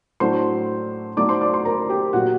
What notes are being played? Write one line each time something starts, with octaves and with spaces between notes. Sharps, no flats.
A2 F#3 A3 D4 C5 C6
F#3 A3 D#4 D5 D6
C5 C6
D5 D6
C5 C6
A#4 A#5
G4 G5
A#2 F#3 A#3 F#4 F#5